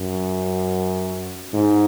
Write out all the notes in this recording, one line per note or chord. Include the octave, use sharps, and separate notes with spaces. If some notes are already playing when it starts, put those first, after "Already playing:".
Already playing: F#2
G#2